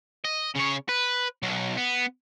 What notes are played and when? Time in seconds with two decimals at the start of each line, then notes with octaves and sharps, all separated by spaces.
0.25 D#5
0.56 C#3 C#5
0.89 B4
1.43 B1 F#3
1.77 B3